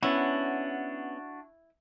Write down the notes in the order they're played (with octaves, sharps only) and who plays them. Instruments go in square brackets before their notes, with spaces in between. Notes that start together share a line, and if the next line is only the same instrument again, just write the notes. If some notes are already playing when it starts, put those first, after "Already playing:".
[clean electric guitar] B3 C#4 [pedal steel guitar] D4 F#4 [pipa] E4